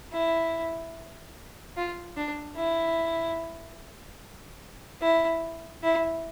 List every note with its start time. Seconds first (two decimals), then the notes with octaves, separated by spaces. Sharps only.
0.12 E4
1.77 F4
2.17 D4
2.57 E4
5.02 E4
5.83 E4